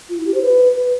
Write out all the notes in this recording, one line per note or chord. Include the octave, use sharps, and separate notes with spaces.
F4
E4
G4
C5
B4